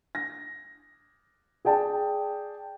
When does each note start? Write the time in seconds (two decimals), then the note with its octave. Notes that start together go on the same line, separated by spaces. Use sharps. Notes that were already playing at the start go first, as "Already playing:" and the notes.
0.15 A#6
1.65 G#4 D5 G5 A5